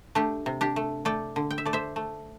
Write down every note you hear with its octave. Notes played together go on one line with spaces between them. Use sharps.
A3 D4 G4
C3
D4 G4
A3
A3 D5 G5
D3
G5
E5
A3 D5
C5 E5
A3